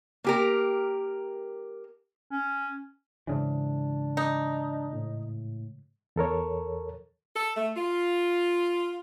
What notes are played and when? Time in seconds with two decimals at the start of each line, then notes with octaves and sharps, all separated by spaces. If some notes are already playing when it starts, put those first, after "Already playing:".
0.24 A#3 G4 A#4
2.31 C#4
3.27 G#2 C#3 E3 D4
4.17 D4 D#4
4.92 A2
6.16 E2 A4 A#4 C#5
7.34 A4
7.55 A3
7.75 F4